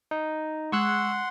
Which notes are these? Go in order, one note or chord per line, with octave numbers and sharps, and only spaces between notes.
D#4
G#3 F#5 C6 C#6 E6 F#6